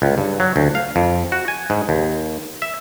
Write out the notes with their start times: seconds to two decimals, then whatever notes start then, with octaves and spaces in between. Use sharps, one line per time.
0.02 C#2
0.18 G2
0.40 F#3
0.56 D2
0.75 F5
0.96 F2
1.32 F#4
1.48 G#5
1.70 G#2
1.89 D#2
2.62 E5